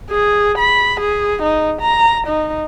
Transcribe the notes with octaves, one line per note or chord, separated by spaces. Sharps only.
G#4
B5
G#4
D#4
A#5
D#4